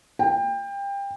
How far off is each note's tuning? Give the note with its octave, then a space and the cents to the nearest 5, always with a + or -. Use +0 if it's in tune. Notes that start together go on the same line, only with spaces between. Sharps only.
G5 +25